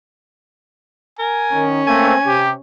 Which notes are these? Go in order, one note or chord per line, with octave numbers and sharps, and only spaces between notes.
A#4 G#5
D#3 C#4
A3 A#3 C4 G#5
C3 G4